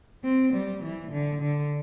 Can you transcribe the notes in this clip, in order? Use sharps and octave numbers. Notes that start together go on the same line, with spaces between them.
C4
G3
E3
D3
D3